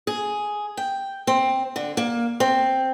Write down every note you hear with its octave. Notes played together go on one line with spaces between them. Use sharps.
G#4
G5
C4
D3
A#3
C4